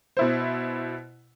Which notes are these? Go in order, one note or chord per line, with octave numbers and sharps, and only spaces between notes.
B2 E4 C5